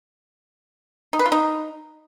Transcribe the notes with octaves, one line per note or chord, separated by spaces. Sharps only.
D#4
B4
F4
D#4